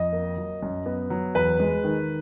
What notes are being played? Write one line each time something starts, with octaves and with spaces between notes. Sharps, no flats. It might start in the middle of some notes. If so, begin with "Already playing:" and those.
Already playing: F2 D#5
A#3
F#3
F#2
B3
F#3
E2 B4
G#3
D#3